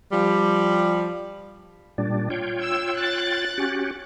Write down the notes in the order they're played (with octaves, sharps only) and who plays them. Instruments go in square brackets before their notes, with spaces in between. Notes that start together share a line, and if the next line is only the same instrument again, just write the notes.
[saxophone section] F3 G3
[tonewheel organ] A#2 G3 D4
F4 C#5 G5
[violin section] E6
F#6 A6
[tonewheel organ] C#4 F#4 G4